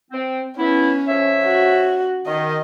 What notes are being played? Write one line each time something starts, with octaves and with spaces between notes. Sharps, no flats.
C4
E3 B3 C#4 E4
F2 C#5 E5
F#4
D#3 D#5